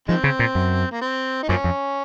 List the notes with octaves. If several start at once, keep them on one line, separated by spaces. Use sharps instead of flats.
D#3 F3 G#3 C4
C#3
A#2
F#2
A#3
C4
D#4
F#2 F3 A#3 C#4
F2